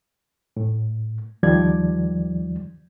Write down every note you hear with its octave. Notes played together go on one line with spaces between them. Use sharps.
A2
D#2 D#3 F3 G3 D5 G#6